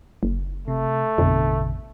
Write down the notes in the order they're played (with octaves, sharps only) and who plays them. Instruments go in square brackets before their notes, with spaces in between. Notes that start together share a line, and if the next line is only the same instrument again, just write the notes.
[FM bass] F#1
[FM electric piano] C3 [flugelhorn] A3
[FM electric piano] A1 B2 D3 [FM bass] F2